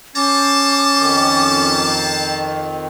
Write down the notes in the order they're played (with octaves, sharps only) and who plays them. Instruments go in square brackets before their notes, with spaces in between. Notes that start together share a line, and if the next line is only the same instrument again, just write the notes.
[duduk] C#4 [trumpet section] C5 A5 [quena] D6
[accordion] F2 D#3